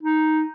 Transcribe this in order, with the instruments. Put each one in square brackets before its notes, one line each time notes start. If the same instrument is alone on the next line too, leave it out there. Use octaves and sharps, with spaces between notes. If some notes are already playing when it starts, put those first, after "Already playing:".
[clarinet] D#4